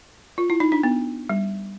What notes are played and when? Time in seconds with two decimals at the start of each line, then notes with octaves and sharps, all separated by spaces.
0.38 F4
0.50 E4
0.60 D#4
0.72 D4
0.83 B3
1.29 G3